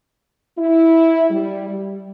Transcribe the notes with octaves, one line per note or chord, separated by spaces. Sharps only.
E4
G3
G3